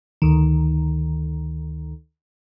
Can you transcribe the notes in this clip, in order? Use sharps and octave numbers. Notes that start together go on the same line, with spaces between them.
D2 D#3